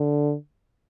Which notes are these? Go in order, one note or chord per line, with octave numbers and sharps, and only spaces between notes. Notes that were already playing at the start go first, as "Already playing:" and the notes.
Already playing: D3